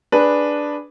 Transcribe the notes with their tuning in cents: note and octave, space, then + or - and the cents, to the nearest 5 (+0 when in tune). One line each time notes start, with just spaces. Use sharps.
D4 +0 G#4 +0 B4 +0